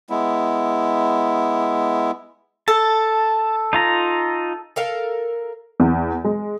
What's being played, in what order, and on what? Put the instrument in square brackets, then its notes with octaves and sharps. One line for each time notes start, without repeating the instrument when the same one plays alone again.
[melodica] G#3 B3 E4
[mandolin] A4 [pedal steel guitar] A5
[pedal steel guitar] D#4 F4 A#5
[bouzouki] A4 A#4 F5
[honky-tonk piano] E2
G#3